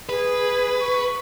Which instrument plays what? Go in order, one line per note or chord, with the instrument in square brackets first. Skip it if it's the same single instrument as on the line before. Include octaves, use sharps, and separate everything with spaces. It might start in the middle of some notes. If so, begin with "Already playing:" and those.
[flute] G#4 [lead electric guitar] B4
[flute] C#6